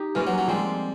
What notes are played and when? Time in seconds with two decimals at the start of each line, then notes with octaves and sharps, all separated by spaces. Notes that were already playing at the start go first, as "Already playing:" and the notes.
Already playing: D#4 G4
0.15 E3 A#3 C#4 F4 A#4
0.27 F#3
0.38 F#3
0.48 F3 G3 G#3 C4